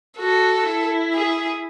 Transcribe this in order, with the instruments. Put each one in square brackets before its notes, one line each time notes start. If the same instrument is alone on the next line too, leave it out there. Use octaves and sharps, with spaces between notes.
[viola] F#4 [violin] A4
[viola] E4
[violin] G#4